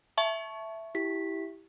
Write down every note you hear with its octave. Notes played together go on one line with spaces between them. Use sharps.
E5 A5 C#6
E4 G4 B6